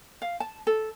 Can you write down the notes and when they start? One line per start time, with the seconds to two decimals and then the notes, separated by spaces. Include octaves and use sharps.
0.22 F5
0.40 A5
0.67 A4